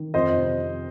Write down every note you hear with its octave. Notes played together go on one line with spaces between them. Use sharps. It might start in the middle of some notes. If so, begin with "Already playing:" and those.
Already playing: D#3
F2 C5 D#5
C3